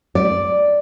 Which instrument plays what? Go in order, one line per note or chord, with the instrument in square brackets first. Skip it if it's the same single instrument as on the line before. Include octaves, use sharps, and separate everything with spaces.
[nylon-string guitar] D5